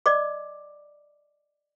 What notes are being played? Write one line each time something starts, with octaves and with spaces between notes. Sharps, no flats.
D5 D#5 D6